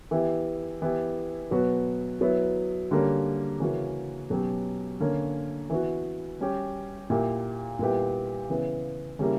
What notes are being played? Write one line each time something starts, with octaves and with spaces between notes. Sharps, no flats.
E3 B3 E4 G4
E3 B3 E4 G4
B2 F#3 B3 F#4
F#3 B3 E4
D3 G3 A#3 C#4
C#3 E3 A#3 C#4 F#4
B2 F#3 C#4 G4
D3 A#3 C#4
E3 B3 F#4
G3 C#4 G4
A#2 A#3 E4 G4
A#2 G3 B3 E4 G4
C#3 E3 B3
C#3 G3 A#3 E4